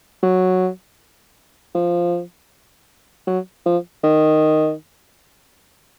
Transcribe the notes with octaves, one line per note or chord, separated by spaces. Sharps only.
F#3
F3
F#3
F3
D#3